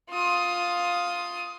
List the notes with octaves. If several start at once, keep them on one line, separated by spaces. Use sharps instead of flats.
F4 D#6